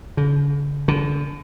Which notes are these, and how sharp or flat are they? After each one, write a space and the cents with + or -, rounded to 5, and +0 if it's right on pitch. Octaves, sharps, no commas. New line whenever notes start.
D3 -45
D3 -30